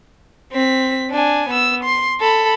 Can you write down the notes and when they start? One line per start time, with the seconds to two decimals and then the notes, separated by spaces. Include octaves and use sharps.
0.52 C4 B6
1.11 D4 G#5
1.50 B3 E6
1.84 C6
2.21 A4 B5